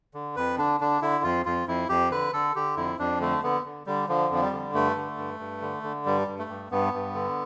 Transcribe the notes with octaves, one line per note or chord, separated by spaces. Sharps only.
D3
F2 B4
D3 D4
D3 D4
D3 E4
F2 F4
F2 F4
F2 E4
F2 G4
D3 B4
D3 A4
D3 G4
F2 E4
F2 D4
D3 A3
D3 B3
D3
D3 G3
D3 F3
F2 F3
G3
D3
G2 A3
D3
G2
G2
D3
D3
G2 G3
G2
A3
G2
G2 B3
G2
D3